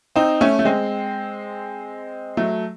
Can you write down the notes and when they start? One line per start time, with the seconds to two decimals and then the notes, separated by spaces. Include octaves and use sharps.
0.16 C4 D#4
0.41 A3 C#4
0.59 A3
0.65 G#3 C4
2.37 F#3 A3